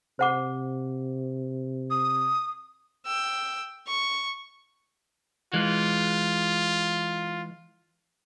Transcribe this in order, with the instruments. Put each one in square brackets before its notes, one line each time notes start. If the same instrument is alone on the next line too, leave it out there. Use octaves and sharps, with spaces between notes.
[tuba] C3 [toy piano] C5 F#5 D6
[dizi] D#6
[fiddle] G5 E6
C#6
[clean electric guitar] E3 G#3 [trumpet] F4